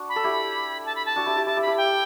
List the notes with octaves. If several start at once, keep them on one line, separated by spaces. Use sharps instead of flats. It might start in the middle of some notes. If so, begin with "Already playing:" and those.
Already playing: D4 F#4
B5
A4
E4 G4
A5
B5
A5
D4 F#4
E4 G4
E4 G4
E4 G4 A5
E4 G4
B5
E4 G4
G5